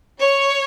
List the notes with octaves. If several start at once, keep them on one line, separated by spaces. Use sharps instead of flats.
C#5